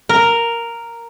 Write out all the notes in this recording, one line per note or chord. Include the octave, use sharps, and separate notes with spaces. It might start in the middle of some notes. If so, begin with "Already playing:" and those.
A#4